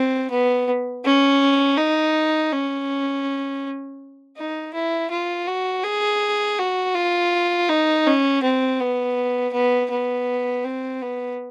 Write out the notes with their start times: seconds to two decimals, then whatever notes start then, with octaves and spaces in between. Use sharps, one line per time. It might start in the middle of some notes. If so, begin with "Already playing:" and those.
Already playing: C4
0.30 B3
1.05 C#4
1.78 D#4
2.52 C#4
4.37 D#4
4.74 E4
5.11 F4
5.47 F#4
5.84 G#4
6.59 F#4
6.95 F4
7.69 D#4
8.06 C#4
8.43 C4
8.80 B3
9.53 B3
9.90 B3
10.64 C4
11.02 B3